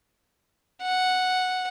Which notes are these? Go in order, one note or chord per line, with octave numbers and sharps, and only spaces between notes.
F#5